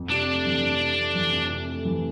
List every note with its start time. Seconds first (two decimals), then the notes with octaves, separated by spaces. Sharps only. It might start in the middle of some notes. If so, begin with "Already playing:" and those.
Already playing: F2
0.10 C3 D4
0.29 A3
0.46 E3
0.64 F2
0.81 C3
0.98 A3
1.15 E3
1.32 F2
1.50 C3
1.68 A3
1.85 E3